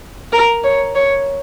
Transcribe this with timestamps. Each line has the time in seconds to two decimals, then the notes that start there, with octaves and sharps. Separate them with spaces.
0.32 A#4
0.64 C#5
0.95 C#5